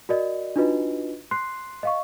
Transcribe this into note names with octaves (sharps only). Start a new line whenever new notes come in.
F#4 A#4 D5 D#5
D4 D#4 F4 F#4 B4 D#5
C6 F#6 C7
D#5 F5 C#6